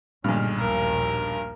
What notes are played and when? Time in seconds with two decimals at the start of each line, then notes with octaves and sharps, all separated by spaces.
0.24 B1 G2 A#2 D3 G#3 F6
0.60 A#1 D#2 A#4